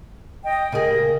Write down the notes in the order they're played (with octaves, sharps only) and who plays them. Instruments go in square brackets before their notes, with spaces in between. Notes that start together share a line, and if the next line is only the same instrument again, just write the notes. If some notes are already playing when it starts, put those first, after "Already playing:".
[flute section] D#5 G5
[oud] C#3 A#3 G#4 [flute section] D#5